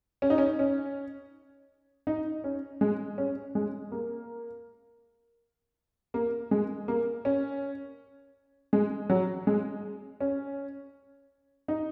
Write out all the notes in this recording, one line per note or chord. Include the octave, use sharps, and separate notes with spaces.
C#4
D#4
C#4
C#4
D#4
C#4
G#3
C#4
G#3
A#3
A#3
G#3
A#3
C#4
G#3
F#3
G#3
C#4
D#4